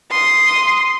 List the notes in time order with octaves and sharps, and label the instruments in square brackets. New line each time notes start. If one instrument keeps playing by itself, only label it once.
[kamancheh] C6 D#6